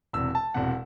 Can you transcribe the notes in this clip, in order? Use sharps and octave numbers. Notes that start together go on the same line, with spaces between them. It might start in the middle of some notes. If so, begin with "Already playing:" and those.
E1 E2 C3 E6
A5
E1 E2 C3 F#5